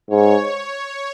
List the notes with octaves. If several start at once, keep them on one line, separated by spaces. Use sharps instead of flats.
G#2 C#5